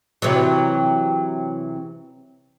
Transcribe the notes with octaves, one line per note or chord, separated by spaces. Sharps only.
C3 E3 F#3